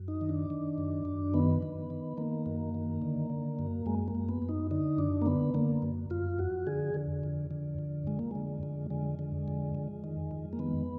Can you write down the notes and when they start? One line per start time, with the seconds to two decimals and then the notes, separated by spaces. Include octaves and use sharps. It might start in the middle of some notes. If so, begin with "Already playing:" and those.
Already playing: F#2
0.08 D#4
0.21 D#3
0.29 D4
0.50 D#3
0.78 F#2
1.05 F#2
1.34 D#3 B3
1.62 D#3
1.90 D#3
2.17 D#3 A#3
2.46 F#2
2.74 D#3
3.02 D3
3.30 D3
3.59 F#2
3.86 F#2 G#3
4.08 A#3
4.15 F#2
4.29 B3
4.42 F#2
4.49 D#4
4.71 D3 D#4
4.98 F#2 D4
5.22 A#3
5.26 D3 B3
5.54 D3 A#3
5.82 F#2
6.10 F#2 F4
6.38 F2 F#4
6.67 D3 G#4
6.94 D3
7.23 F2
7.51 D3
7.79 F2
8.07 F2 G#3
8.19 A#3
8.31 D3 G#3
8.63 F2
8.90 D3 G#3
9.19 D3
9.48 F2
9.75 F2
10.04 D#3
10.31 F2
10.53 A#3
10.59 D#3 B3